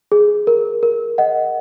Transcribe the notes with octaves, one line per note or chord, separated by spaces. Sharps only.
G#4
A#4
A#4
D#5 F#5